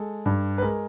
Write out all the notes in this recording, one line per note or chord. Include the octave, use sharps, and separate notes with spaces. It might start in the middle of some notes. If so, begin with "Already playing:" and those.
Already playing: G#3 A4
G2
B4
G#3 A#4